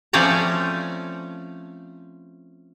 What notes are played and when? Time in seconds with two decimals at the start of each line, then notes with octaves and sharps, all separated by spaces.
0.13 F3 A3 C4 C#4 D5 A#5